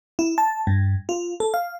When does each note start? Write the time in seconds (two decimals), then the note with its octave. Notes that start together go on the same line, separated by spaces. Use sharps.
0.19 E4
0.38 A5
0.67 G2
1.09 F4
1.40 A4
1.54 F5